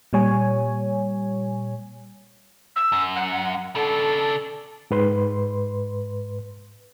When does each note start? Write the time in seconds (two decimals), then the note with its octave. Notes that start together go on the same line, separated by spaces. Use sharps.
0.13 A#2 G3 C#5 G#5
2.76 E6
2.92 F#2
3.15 F#5
3.75 C#3 D4 A4
4.91 G#2 B4 C6